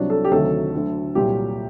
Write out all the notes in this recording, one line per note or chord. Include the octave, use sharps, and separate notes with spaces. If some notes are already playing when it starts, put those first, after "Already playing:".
Already playing: C2 C3 F#3 D4
A4
G4
D2 C3 D#3 F#3 A4
D2 D3 F#3
C2 A#2 F#3 G4